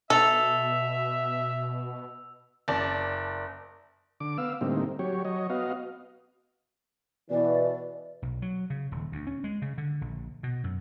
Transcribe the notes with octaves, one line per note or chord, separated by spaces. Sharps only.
B2 A4 E5 E6 F7
F#1 D5 A5
D3 D6
B3 F5 E6
A2 D3 G3 A#3 C4 D#4
F#3 G4 C#5
F#3 C#5 D#5
B3 F#4 D#5 F5
B2 E3 D5
B1
F#3
C#3
D#1
D2
C#4
G#3
C#3
D3
A#1
B2
F#2